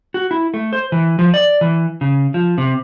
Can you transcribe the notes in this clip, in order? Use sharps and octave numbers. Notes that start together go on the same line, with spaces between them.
F#4
E4
A3
C5
E3
F3
D5
E3
C#3
F3
C3